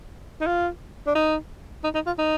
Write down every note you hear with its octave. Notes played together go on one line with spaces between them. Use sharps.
D#4
F4
D4
D#4
D#4
D#4
F4
D#4